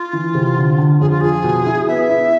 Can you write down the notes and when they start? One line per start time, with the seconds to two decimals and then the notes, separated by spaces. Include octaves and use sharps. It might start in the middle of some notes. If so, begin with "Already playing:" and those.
Already playing: F4
0.13 E3
0.35 C3
0.57 D3
0.78 D3
1.00 F2 G#4
1.10 F4
1.21 F3 G#4
1.44 B2
1.66 E4
1.88 B3 E5
2.10 E4